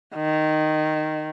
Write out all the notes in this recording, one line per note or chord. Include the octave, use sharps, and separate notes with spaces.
D#3